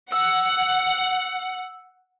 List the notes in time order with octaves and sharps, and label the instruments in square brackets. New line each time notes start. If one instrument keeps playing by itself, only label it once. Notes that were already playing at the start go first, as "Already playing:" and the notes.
[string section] F#5 [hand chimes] E6